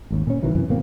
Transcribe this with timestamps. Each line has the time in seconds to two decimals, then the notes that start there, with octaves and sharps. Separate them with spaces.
0.11 G#1 D#2
0.27 A#2 C#4
0.43 B1 D#3 E3 F#3
0.55 F#1 F#2 C3 E3
0.68 G#1 B2 A#3 C4